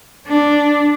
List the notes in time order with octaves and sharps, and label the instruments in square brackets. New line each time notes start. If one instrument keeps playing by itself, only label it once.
[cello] D4